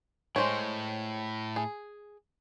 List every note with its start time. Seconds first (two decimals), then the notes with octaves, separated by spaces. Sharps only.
0.36 A2 G#3 C5 C#5
1.56 G#4